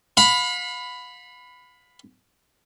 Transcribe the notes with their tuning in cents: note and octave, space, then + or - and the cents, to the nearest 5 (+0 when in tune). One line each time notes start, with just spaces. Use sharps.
F5 +40 B5 +10